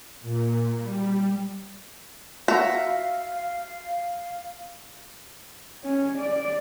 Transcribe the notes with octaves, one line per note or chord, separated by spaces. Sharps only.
A#2
G3
F#4 E5 F5 A#5
C#4
D5